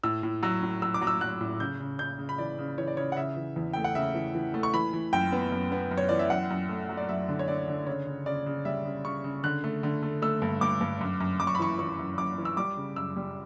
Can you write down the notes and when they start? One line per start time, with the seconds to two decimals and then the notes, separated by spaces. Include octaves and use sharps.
0.03 A2 E6
0.23 A2
0.43 F#3 E6
0.63 A2
0.82 F#3 E6
0.94 D6
1.02 F#3
1.07 E6
1.21 F#3 F#6
1.41 A2
1.60 C#3 G6
1.80 C#3
1.99 C#3 G6
2.19 C#3
2.29 B5
2.38 E3 D5
2.58 C#3
2.78 E3 C#5
2.87 D5
2.97 C#3 C#5
3.12 F#5
3.17 C#3 E5
3.37 E3
3.56 E2
3.73 A3 G5
3.84 F#5
3.95 C#3 E5
4.15 E3
4.35 E3
4.54 A3
4.63 C#6
4.74 E3 B5
4.93 E3
5.13 F#2 G5
5.32 B3
5.52 F#2
5.72 B3
5.91 F#2
5.98 C#5
6.09 E3 D5
6.19 E5
6.30 F#2 F#5
6.50 F#2
6.69 A3
6.89 F#3
6.97 D5
7.09 F#2 E5
7.29 D3
7.39 C#5
7.48 D3 D5
7.68 D3
7.87 C#3 C#5
8.07 C#3
8.26 C#3 D5
8.46 C#3
8.65 G3 E5
8.85 C#3
9.05 C#3 C#6
9.24 C#3
9.44 D3 F#6
9.64 A3
9.83 D3
10.03 A3
10.22 A3 E6
10.42 G2
10.61 G2 D6
10.81 G2
11.01 F#2
11.20 F#2
11.40 F#2 D6
11.47 C#6
11.55 B5
11.59 E3 C#6
11.79 E3 C#6
11.99 F#2
12.18 F#2 D6
12.38 E3
12.45 E6
12.57 G3 D6
12.77 C#3
12.96 F#2 E6
13.16 G3